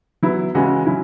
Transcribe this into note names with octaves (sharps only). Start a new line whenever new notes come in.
F#3 B3 E4
C#3 E3 G#3 C#4 F#4
F#3 C#4 E4